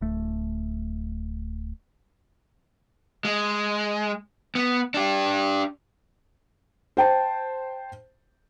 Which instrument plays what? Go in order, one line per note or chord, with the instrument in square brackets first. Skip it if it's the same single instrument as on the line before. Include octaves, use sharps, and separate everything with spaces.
[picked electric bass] D1 A3
[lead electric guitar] G#3
B3
D4 G4
[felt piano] C5 G5 A5